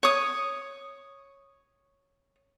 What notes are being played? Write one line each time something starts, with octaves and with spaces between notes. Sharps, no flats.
C#5 D#6